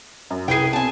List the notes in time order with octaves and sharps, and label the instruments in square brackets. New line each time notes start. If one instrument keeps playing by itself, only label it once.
[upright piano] F#2
[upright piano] C2 [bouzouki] G#4 B4 G5
[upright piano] B2 C4 [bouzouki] G#5 A5